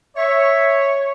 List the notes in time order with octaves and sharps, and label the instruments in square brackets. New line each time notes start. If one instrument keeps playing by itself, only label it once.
[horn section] C#5 [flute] E5